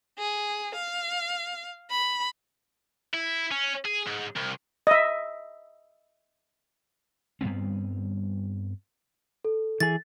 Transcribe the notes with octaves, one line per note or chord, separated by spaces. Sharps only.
G#4
F5
B5
E4
C#4
G#4
G#2
C2
D#5 E5
G2 G3 B3 C4
A4
E3 G#4 A6